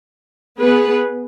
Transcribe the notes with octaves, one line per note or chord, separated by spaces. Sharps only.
B3 G#4 B4